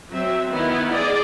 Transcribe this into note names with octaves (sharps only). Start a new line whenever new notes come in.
F#3 C4 E5
D#3 B3 E4
G#4 D5 D#5